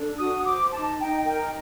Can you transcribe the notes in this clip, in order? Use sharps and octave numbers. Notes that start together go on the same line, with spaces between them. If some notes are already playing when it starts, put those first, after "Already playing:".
Already playing: D4 A4
F#4 D#6
C5 D6
D#4 A5
D#4 G5
A#4 G5